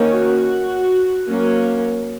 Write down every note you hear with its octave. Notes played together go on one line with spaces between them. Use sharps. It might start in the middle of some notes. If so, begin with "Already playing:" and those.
Already playing: D#3 A#3 C#4
F#4
F#3 A#3 C#4